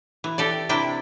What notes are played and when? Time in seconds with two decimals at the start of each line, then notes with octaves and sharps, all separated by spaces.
0.24 E3
0.38 G4 A4 D5
0.69 C3 D4 E4 G5